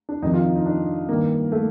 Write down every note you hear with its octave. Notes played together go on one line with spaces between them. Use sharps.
D4
F2 C3 D#3 D#4
F4
D#4
D#4
D4
G2 D#3 A#3
A3